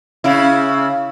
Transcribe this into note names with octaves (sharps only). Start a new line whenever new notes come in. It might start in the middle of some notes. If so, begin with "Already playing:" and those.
C#3 E4